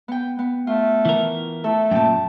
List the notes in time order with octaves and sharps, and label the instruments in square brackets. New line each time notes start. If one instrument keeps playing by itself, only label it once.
[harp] B3 G5
B3
[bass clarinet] A3 [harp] F4
[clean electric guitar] E3 A#4
[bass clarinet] A3 [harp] A4
[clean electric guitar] F#2 A#2 [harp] G5 A5